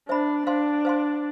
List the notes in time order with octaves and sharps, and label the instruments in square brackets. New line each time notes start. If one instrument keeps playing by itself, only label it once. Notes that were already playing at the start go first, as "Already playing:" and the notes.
[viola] D4 [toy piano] C5 E5 B5
[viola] D4 [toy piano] C5 F5 C6
[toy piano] C5 F5 C6